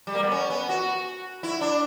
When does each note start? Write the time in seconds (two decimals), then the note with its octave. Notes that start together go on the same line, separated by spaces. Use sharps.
0.07 G3
0.15 A#3
0.23 B3
0.32 C#4
0.50 B3
0.69 F#4
1.43 E4
1.61 D4